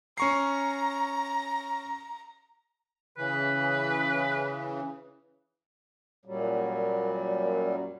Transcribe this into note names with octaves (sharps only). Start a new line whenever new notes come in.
C#4 A#5 C#6 C7
C#3 E3 B4
F#2 A#2 F#3 G3